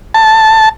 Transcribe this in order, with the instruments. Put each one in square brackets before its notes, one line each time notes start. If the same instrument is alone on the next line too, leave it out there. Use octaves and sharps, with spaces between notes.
[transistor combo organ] A5